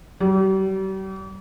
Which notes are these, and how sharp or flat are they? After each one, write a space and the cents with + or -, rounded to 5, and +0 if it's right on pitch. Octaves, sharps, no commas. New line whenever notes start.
G3 -40